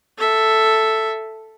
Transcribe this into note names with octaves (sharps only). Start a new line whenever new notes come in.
A4 E5